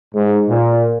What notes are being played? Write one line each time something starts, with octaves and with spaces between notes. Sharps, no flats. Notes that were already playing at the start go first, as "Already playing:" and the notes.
G#2
A#2